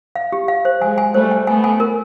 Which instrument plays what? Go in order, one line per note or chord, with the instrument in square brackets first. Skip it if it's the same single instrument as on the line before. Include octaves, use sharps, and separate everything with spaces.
[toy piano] F5
G4
F5
C5
[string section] F#3 G#3 [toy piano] G#5
[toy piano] G#5
[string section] G3 A3 [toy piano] C5
[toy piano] G#5
[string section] A3 B3 [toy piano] G#5
[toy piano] G#5
A#4